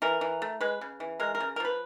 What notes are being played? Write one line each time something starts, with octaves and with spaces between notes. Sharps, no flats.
E3 A#4
E3
A3
G#3 B4
C#3
E3
G#3 A#4
A#4
C#3
A#4
F3 B4